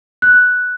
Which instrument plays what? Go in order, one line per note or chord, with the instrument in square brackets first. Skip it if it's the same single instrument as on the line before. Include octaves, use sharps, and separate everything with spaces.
[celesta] F#6